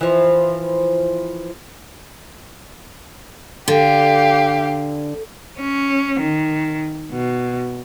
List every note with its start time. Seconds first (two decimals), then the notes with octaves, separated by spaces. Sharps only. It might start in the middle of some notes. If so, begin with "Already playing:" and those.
0.01 E3 F3
3.68 D3 G4 F5
5.60 C#4
6.20 D#3
7.12 B2